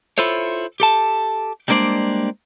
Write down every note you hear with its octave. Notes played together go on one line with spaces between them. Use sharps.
E4 F4 A4 C5 C#5
G4 A4 A5
G3 G#3 A#3 D4 C5 D5